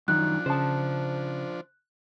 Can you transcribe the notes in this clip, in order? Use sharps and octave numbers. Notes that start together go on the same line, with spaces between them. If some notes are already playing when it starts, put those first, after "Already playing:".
F#2 D#3 F3 D4 F#6
C#3 C5 A5